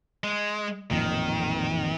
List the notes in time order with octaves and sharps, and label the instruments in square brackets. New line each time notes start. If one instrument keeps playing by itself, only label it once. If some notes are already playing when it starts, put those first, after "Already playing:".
[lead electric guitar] G#3
[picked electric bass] A1 F2 A#2 [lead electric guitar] D#3